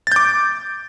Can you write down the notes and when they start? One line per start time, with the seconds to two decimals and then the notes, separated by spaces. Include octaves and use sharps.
0.07 A6
0.12 G6
0.16 D6